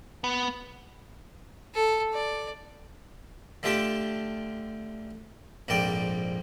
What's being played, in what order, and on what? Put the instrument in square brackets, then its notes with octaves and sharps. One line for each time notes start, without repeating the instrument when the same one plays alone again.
[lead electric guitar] B3
[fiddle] A4
D5
[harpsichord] D3 A3 F4 G4 G5 A5
A#1 F2 G#2 A#3 D5 G5